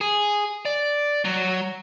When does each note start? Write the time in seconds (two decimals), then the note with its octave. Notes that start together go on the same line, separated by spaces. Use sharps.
0.01 G#4
0.65 D5
1.25 F#3